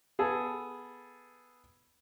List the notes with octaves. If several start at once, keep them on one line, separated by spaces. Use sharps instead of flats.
B3 G#4 A4